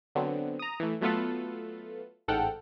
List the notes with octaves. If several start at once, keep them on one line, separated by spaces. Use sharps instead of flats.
D3 F#3 B3 C4
A#5 D#6
E3 A3
F#3 A3 B3 F4 A4 B4
A1 G#2 A4 F#5 G5 F6